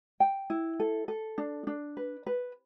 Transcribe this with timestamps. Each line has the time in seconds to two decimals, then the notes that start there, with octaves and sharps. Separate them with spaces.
0.20 G5
0.50 E4
0.80 A4
1.08 A4
1.38 D4
1.67 D4
1.97 B4
2.26 B4